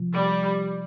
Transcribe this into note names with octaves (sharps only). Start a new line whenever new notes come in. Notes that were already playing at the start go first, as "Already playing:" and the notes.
Already playing: C3 F3
G3